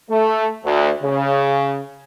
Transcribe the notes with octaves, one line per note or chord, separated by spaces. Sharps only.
A3
D2
C#3